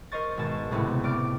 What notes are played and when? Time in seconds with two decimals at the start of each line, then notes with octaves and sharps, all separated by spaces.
0.12 A#4 C5 D#5 C#6 A6
0.37 G#1 B2 A5 A6
0.71 C#2 A2 C3 A3 B3
1.04 A2 D5 D6 F6 D7